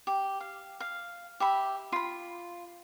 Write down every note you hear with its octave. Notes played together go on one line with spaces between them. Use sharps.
G4
F5
F5
G4 E5 B5
F4 B5